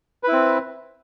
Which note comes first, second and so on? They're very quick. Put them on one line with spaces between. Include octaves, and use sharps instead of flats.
B4 E4 C4